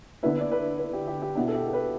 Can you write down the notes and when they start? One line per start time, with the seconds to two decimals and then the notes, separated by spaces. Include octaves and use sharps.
0.23 D3 B3 E4 B4
0.40 D5
0.52 B4
0.79 B4
0.93 G4
1.07 G4
1.22 G4
1.35 B2 B3 D4 E4
1.48 A4
1.55 G4
1.68 A4
1.73 B4